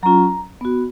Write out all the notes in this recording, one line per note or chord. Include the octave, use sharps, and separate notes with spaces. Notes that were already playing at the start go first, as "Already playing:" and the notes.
F#3 C#4 F4 A#5
B3 F#4